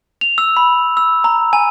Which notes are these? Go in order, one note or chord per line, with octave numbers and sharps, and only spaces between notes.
F7
E6
B5
E6
A#5
G#5